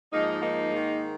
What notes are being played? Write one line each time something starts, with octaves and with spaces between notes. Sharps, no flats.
G#2 F3 A#3 D#4
A#3 D#4
G#2 D#3